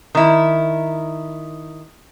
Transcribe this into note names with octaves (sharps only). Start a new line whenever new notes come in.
D#3 E4